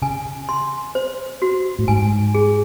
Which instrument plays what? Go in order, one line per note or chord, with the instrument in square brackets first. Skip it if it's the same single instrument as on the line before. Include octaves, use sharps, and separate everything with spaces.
[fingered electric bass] C#3 [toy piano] G#5
[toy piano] C6
C5
F#4
[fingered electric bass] A2
[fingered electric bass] G#2 [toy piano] G#5
[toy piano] G#4